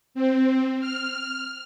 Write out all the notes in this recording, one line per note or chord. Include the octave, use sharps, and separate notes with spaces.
C4
F6